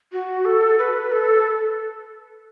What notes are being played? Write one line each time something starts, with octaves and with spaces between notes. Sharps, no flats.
F#4
A4
B4
A4